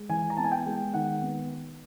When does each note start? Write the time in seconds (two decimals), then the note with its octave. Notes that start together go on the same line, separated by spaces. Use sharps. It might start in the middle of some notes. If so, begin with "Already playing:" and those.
Already playing: G#3
0.09 E3 G#5
0.30 A#5
0.37 B3 A5
0.44 G#5
0.52 G5
0.66 G#3
0.94 D#3 F#5
1.23 B3